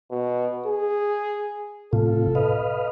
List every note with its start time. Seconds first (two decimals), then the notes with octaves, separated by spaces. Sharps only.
0.11 B2
0.66 G#4
1.93 A2 C3 F4 A4
2.35 B4 D#5 F5